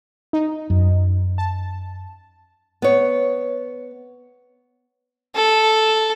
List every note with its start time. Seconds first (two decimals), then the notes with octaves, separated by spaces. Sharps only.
0.33 D#4
0.70 F#2
1.38 A5
2.82 B3 C#5
5.35 A4